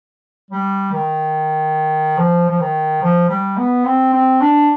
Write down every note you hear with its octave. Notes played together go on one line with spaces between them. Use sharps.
G3
D#3
F3
F3
D#3
F3
G3
B3
C4
C4
D4